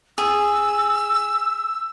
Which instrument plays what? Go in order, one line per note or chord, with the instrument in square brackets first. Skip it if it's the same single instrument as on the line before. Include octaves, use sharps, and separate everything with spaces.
[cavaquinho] G#4 [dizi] E6